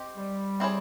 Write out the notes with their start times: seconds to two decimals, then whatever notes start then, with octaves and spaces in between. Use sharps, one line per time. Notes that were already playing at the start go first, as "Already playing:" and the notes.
Already playing: C4 G4 D#5
0.17 G3
0.60 C4 E4 G#4 C#5